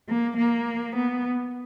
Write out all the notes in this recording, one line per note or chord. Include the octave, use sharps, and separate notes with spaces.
A#3
A#3
B3